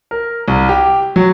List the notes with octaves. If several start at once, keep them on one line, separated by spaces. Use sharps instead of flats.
A#4
C2
G4
F#3